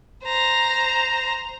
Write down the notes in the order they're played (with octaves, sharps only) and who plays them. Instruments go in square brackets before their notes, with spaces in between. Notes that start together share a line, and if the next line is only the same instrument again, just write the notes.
[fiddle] C5 A#5